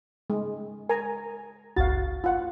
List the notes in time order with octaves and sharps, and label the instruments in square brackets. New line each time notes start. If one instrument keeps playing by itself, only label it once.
[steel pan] G#3
[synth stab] A#4 A#5 [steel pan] G#5
[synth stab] G1 C#2 A6 [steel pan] F#4 F5
[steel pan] F4 F#5